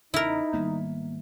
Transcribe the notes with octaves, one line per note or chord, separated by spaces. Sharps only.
E2 C#3 D#4 E4 A#4
G#1 D#3 G3 A#3 B3